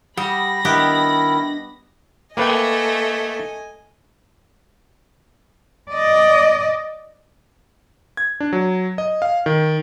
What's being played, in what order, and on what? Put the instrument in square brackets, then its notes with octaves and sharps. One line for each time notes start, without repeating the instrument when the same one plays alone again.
[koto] G3 [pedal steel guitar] G4 F#5 D#6 [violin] B5 A#6
[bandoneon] D#3 E4 [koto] B3 G4 [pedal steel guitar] D4 D#5
[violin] A3 [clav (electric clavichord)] A#3 B4 G5 [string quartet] D#5 G#5
[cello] D5 D#5
[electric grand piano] G#6
D4
F#3
D#5
F5
D#3